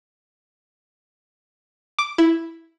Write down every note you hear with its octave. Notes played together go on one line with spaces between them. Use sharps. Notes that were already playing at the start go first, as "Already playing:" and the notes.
D6
E4